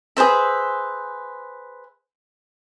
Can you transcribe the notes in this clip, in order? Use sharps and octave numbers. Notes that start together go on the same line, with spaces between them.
G#4 B4 C5 E5